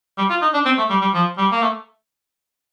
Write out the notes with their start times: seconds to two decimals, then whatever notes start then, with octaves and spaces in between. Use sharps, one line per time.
0.18 G3
0.30 F4
0.42 D#4
0.54 D4
0.65 C4
0.78 A3
0.90 G3
1.02 G3
1.14 F3
1.38 G3
1.52 A#3
1.62 A3